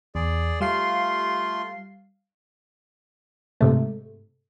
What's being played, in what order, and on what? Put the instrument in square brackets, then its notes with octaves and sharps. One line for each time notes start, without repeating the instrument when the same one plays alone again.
[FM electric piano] E2 [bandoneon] G#4 D5
[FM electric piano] G3 F5 C7 [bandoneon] A3 F4 C6
[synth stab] G#2 C3 A3